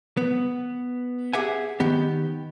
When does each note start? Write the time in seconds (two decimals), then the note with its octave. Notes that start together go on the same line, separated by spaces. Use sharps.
0.17 B3
1.33 G4 G#4 E5 F#5 G#5
1.80 D#3 B3 G4